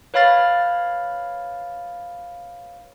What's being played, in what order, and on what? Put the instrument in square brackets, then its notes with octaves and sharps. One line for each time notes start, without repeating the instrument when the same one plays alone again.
[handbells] B4 C#5 F5 B5 F6 A6